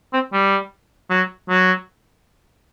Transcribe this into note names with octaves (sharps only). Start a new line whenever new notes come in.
C4
G3
F#3
F#3